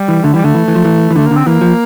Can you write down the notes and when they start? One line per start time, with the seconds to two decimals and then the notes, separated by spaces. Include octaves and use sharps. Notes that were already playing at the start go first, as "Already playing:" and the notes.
Already playing: G3
0.08 E3
0.24 D3 A3
0.34 E3 G3
0.44 D3 A3
0.55 E3
0.68 E3
0.75 F3
0.85 E3
1.10 E3
1.16 D3 A3
1.26 D3 A#3
1.36 C4
1.46 E3 A#3
1.61 F3